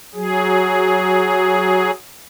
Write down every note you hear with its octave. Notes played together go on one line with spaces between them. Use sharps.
F#3 G#4